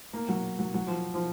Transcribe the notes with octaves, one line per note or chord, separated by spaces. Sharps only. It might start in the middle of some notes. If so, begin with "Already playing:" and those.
A#3
F#3
F#3
F#3
F3
F3